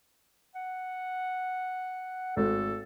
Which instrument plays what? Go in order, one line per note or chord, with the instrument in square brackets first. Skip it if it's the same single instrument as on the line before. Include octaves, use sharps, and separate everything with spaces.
[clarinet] F#5
[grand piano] G#1 A3 [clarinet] A4